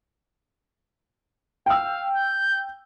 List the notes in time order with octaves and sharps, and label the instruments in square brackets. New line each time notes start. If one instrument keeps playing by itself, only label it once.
[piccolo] F5 [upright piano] G5 E6
[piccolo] G6